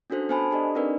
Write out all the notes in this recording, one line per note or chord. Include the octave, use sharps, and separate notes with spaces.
C#4 D4 F#4 A4 C5
B3 A4 C5 G#5 A5 B5
D4 G4 A4 D5 D#5
C4 D4 D#4 A#4 B4 D5